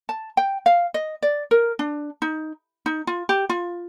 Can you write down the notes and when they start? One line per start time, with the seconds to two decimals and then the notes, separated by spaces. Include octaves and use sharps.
0.09 A5
0.37 G5
0.66 F5
0.94 D#5
1.22 D5
1.51 A#4
1.79 D4
2.22 D#4
2.86 D#4
3.07 F4
3.29 G4
3.49 F4